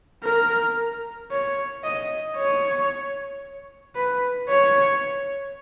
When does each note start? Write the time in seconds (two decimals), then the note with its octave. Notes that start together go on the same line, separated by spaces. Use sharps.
0.24 A#4
1.31 C#5
1.84 D#5
2.36 C#5
3.96 B4
4.49 C#5